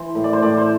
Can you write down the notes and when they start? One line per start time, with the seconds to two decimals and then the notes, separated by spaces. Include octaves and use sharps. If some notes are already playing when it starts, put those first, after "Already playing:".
Already playing: E3 C5
0.15 A2
0.24 D5
0.33 C5
0.42 A2 D5
0.57 C5